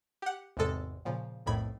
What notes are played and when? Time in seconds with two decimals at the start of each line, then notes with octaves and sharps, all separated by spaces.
0.22 G4 F#5
0.57 G#1 E2 C3 G#3 A4
1.05 A#2 C#3 F3
1.46 B1 F2 A2 D#3 B5 G#6